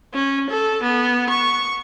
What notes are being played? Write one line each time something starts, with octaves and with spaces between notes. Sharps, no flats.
C#4
A4
B3
C#6